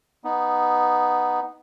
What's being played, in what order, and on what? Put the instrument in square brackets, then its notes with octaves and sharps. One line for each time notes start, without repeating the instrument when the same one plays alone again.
[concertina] B3 D#4